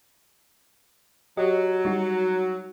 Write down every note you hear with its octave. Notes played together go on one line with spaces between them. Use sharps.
F#3 G4 D#5
G3 D#4 F#4